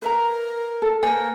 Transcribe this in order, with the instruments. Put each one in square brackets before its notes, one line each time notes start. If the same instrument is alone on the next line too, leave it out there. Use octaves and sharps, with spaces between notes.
[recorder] A#4 [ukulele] B4 E5 A#5
[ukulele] A4
[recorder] A#3 [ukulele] B4 C5 D5 [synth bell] G#5